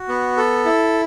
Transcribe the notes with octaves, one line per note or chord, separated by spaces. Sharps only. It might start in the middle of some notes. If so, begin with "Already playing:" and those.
Already playing: F#4
B3
A4
E4